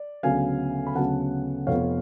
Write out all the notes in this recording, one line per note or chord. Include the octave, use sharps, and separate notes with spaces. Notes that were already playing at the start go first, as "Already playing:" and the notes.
Already playing: D5
D2 C#3 F#3 B3 F5 G#5
B5
D2 C#3 F#3 B3 F#5 A5
F1 F2 F3 B3 F4 C#5 F5